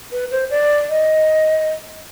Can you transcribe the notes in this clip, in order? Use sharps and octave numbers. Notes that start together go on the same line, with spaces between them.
B4
C5
D5
D#5